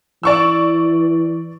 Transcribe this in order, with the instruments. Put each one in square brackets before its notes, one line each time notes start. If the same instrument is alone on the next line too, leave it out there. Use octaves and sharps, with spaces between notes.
[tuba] E3 [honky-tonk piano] D5 C#6 E6